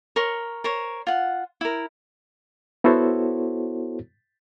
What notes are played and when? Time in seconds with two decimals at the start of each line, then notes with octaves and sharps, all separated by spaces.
0.16 A#4 C#5 C6 C#6
0.64 A#4 C5 C#5
1.07 F4 F#5
1.61 E4 A#4
2.84 B3 E4 F#4 A4 C5 C#5